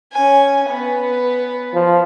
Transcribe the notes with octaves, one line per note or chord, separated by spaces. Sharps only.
C#4 G#5
B3 B4
F3